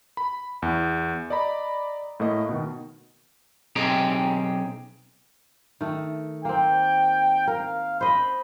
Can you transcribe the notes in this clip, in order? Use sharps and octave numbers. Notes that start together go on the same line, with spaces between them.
B5
E2
D5 D#5 A#5 B5
A2 A3 A#3 D#5
B2 D#3
B1 C4 D#4 G4 G#4 A#5
D#3 A3
A#3 C4 G5
A#4 F5
C5 D#5 B5